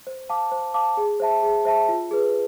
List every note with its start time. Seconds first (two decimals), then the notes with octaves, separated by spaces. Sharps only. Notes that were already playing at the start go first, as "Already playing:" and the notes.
0.07 C5
0.29 F5 A5 D6
0.52 C5
0.74 F5 A5 D6
0.97 G#4
1.20 C5 E5 A5
1.43 G#4
1.65 C5 E5 A5
1.88 F4
2.11 G#4 B4